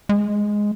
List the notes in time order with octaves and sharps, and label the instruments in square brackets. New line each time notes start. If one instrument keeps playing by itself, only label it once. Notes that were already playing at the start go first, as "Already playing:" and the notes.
[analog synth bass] G#3